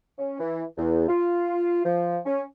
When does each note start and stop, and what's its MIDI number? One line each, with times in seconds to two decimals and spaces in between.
0.18 0.39 61
0.40 0.64 52
0.77 1.06 40
1.08 1.82 65
1.85 2.19 53
2.26 2.42 61